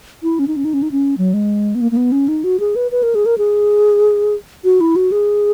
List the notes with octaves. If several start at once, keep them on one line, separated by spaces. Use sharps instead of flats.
E4
C#4
D#4
C#4
D#4
C#4
D#4
C#4
F#3
G#3
B3
A#3
A#3
B3
C#4
D#4
F#4
G#4
B4
B4
A#4
G#4
A#4
G#4
F#4
E4
F#4
G#4